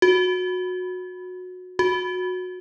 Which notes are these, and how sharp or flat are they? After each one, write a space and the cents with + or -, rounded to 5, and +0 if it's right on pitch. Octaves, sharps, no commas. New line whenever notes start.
F#4 -20
F#4 -20